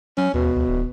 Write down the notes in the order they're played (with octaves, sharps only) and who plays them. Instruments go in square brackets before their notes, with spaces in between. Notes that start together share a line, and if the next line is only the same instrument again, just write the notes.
[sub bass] F#3 [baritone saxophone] C#4
[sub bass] D#2 [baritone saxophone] B2
[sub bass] D2
D1